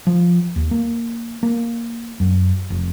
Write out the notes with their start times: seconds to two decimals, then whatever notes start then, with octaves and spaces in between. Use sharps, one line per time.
0.07 F3
0.56 D#2
0.71 A#3
1.43 A#3
2.20 F#2
2.70 F1